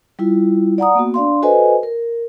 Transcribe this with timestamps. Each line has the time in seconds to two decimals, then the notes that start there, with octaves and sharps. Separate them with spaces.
0.19 G3 E4 F4
0.78 D5 F#5 A#5 D#6
0.95 A#3 B3 F#4
1.14 D4 D5 F5 C6
1.42 F#4 A4 B4 C5 D#5 G#5
1.83 A#4